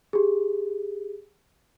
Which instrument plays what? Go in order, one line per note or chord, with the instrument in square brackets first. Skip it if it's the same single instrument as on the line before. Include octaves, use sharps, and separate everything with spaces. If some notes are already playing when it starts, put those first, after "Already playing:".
[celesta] G4 G#4